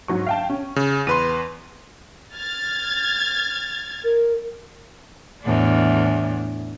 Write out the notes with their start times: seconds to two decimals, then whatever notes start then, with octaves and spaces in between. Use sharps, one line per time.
0.08 G#2 F#3 C#6
0.27 F5 G5 A5
0.50 C#4
0.76 C#3
1.07 E2 B4 C6 D#7
2.35 F6 G#6 A6
4.04 A#4
5.43 E2 A2 D4